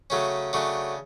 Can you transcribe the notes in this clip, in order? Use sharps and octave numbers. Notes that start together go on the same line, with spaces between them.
C#3 F#3 A3 C#4
C#3 F#3 A3 D4